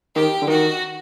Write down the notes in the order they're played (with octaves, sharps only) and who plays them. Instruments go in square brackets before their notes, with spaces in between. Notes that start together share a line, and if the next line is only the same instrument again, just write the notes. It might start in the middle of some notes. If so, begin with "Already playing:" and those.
[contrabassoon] D#3 [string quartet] G4
[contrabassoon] D3
[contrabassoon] D#3 [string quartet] F#4